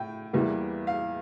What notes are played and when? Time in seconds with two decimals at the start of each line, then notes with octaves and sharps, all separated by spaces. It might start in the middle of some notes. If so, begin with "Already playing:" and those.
Already playing: A2 G5
0.33 E2 E3 G3 A#3
0.87 F5